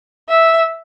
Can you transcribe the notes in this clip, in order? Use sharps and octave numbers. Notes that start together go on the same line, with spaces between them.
E5